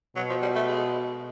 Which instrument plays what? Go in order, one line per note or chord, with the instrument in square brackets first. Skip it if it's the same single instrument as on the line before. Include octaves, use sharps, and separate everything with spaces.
[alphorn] B2 [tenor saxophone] F#3
[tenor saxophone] F3
G3
A3
G#3